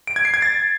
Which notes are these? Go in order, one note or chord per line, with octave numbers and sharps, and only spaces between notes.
D7
G#6
C7
G#6
A6